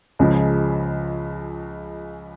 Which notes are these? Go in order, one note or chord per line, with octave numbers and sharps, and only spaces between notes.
C#2 C#3 F3 G#3